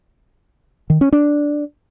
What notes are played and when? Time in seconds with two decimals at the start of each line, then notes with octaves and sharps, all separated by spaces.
0.90 D#3
1.01 C#4
1.13 D4